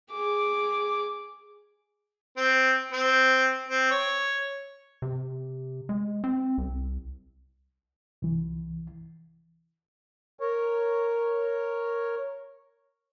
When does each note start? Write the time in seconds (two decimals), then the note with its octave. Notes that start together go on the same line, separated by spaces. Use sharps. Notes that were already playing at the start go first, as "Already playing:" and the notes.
0.11 G#4 D6
2.37 C4
2.93 C4
3.69 C4
3.91 C#5
5.02 C3
5.89 G#3
6.24 C4
6.58 C2
8.22 C2 E3
10.39 A#4 C#5